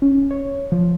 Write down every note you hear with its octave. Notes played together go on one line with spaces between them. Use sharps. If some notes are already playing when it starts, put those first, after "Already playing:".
C#4
C#5
F3